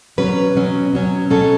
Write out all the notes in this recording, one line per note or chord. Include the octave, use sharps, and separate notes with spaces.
B2 F#3 C#4 B4
B2 F#3 C#4
B2 F#3 C#4
B2 F#3 C#4 A4